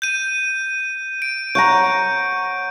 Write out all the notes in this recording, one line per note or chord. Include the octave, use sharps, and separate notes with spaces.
G6 D#7
D7
C#5 F#5 A#5 G6